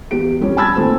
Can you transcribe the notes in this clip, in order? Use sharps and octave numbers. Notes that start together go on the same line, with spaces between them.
E2 G4 D7
F2 G3 C#4
G#5 A5 B5 E6 G#6 A6
A#2 D#3 A3 C4